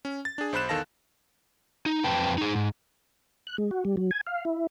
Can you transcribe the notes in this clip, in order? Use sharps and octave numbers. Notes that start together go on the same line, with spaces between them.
C#4
A6
D4 G#4
B1 C5 B5 F#6 E7
E2 D#3 A4 F5 A5 A#6
D#4
F2 C4 B4 G5 A5
D#4 G#4
G#2
F#6
G#3
F#4
G3
F#3
G#5
F5
E4